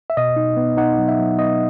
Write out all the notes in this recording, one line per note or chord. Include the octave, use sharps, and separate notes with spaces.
E5
B2 D#5
D#4
B3
D#4 F#5
F#3
E5
F#3
B3 D#5